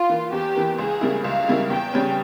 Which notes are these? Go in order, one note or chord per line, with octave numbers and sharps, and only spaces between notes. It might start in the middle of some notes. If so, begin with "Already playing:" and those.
Already playing: F4
E3 A#3
E2 G4
E3 A#3
C#2 G#4
C#3 G3 A#3 E4
C#2 F5
C#3 G3 A#3 E4
E2 G5
C#3 G3 C#4